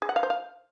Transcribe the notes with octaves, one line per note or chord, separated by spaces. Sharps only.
G#4
F#5
F5
C5
F5